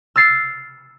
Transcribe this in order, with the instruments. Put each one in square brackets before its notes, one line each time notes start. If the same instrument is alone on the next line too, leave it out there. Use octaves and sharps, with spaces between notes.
[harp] E6 F6 A6 C7 C#7 E7